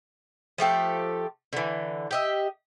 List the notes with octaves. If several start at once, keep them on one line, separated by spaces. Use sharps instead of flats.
F3 A3 G4 A4
D3 E3
G4 D#5 E5